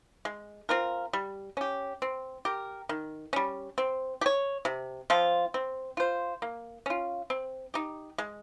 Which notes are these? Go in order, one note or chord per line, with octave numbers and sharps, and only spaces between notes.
G#3
C4 F4 A#4
G3
C#4 G4
C4
G4 A#4
D#3
G3 C#4
C4
G4
C#5
C3
F3 C4 F4
C4
F4 C5
A#3
C#4 F4
C4
D#4 G4
G#3